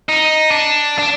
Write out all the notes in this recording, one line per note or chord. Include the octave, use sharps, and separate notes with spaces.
D#4
D4
D4